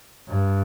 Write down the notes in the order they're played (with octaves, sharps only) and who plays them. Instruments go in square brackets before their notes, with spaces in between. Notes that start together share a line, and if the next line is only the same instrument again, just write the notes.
[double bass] G2